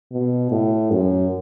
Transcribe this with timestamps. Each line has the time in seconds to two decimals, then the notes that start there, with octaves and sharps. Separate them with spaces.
0.12 B2
0.51 A2
0.91 F#2